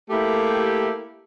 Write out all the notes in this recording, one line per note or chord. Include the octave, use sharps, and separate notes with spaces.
A3 A#3 E4 G4